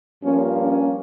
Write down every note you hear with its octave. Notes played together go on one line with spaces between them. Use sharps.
G2 F3 A#3 C#4
C#4